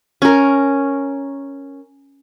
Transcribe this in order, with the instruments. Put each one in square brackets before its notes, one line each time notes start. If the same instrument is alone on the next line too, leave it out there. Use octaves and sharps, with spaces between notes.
[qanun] C#4 A#4